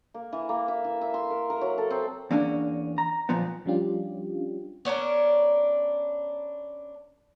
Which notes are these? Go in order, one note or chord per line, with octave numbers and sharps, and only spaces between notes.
A#3
E3
A#3
E5
E3
E5
C6
A#4
A#4
F#3
A4
C4
E2 A#3 C#4 D4
A#5
A#2 F3 B3
F3 G3 C#4 D4 F4 G4
B3 C#4 D4 A#4